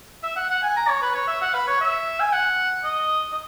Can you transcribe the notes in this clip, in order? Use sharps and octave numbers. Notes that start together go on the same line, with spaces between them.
E5
F#5
F#5
G#5
A#5
C#5
B4
C#5
E5
F#5
B4
C#5
E5
G#5
F#5
D#5
D#5